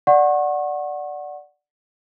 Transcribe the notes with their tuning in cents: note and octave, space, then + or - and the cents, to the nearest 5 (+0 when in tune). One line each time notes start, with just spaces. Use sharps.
D5 +0 F#5 -5 C#6 -35